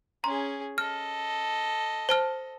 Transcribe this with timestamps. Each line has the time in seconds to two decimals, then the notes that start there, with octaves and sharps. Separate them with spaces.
0.24 C#4 G#4 A#5 C6
0.78 A4 D#5 F6
2.09 C5 A5 F6